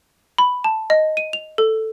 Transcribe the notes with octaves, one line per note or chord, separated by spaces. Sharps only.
B5
A5
D#5
D#7
F7
A4